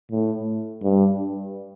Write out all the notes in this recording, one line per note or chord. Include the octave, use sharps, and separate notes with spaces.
A2
G2